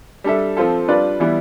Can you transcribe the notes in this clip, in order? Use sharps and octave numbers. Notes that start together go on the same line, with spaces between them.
G3 D4 A4 E5
F3 C4 F4 A4
G3 D4 F4 B4 D5
E3 G3 B3 E4